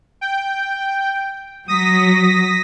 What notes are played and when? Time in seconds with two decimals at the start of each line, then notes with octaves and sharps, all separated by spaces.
0.21 G5
1.68 F#3 D#6 A#6 B6